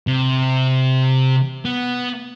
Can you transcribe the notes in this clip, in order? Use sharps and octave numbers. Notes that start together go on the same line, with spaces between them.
C3
B3